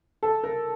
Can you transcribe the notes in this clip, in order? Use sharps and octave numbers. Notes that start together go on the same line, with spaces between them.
A4
A#4